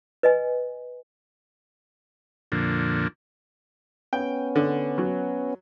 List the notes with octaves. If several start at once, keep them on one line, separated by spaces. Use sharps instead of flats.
B4 D#5 G#5
F2 A#2 D3
B3 C#4 G5
D3
F#3